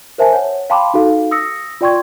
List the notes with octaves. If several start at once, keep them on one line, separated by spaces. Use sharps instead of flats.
A#4 C5 E5 G#5 A5
C#5 F#5
F5 G5 A5 B5 C6 D6
D#4 F#4 A4 F5
D#6 E6 A#6 C#7
F4 D5 G5 C6 C#6 G#6